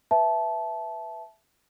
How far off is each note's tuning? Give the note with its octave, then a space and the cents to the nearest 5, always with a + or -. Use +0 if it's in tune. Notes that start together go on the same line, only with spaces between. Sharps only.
B4 +0 E5 +5 A5 -20